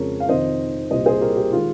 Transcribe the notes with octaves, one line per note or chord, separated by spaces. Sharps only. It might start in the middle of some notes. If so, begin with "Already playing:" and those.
Already playing: F2 C#3 G#3 A#4 C#5
F5
F2 C3 D#3 C5 D#5
C2 A#2 G3 C5 D#5
G#4 C5
G4 A#4
G4
D#3 G#3 F4